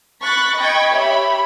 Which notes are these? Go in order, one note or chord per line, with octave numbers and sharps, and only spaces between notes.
B5 C#6 F#6 A6
D#5 G5 B5 C#6 G#6
G4 C#5 E5 B5